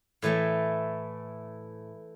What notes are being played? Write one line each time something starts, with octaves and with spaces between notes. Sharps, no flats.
A2 E3 A3